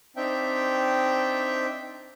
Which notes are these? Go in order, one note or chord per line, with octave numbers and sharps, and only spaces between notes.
C4 D4 D#4 E5 G5